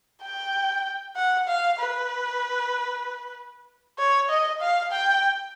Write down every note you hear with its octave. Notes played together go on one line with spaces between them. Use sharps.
G5
F#5
F5
B4
C#5
D#5
F5
G5